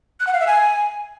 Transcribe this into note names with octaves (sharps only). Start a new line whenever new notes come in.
F#6
F#5
F5
E5
G#5